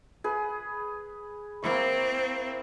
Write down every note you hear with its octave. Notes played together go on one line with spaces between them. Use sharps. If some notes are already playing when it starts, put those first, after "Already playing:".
G#4 B4
A#3 C4 E4 C#6